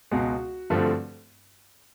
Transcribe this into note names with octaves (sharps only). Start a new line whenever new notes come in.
C#2 B2 G#3 F#4
G2 D3 F3 A3 C4